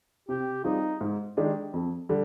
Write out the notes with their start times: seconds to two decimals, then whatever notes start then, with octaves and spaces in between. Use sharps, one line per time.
0.28 C3 G4
0.64 G3 C4 D#4 F4 G#4
1.01 G#2
1.37 D#3 G#3 D4 G4
1.73 F2
2.09 D3 G3